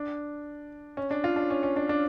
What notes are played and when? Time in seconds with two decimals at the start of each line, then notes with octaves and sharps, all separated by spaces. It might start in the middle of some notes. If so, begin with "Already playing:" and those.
Already playing: D4
0.97 C#4
1.11 D4
1.24 F4
1.36 D4
1.50 C#4
1.63 C#4
1.76 D4
1.89 D4